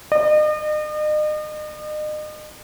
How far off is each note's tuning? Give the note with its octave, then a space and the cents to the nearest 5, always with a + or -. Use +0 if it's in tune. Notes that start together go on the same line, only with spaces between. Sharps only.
D#5 -40